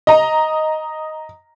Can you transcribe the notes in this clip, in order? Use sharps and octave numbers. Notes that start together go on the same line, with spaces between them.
D#5 A#5